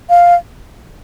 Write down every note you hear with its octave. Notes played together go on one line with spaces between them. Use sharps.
F5